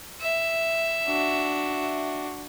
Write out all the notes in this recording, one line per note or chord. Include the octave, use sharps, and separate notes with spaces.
E5
D4 F#4